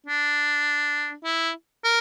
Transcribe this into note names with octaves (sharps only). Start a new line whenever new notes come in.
D4
E4
A#4